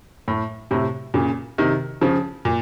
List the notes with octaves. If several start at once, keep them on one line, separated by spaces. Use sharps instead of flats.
A2
A2 C3
A#2 C#3
C3 D#3
C#3 F3
A#2